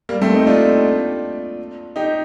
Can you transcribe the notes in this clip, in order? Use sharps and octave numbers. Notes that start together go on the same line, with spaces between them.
G3 A#3
A3 C4
C4 D#4
D4 F4
D#4 G4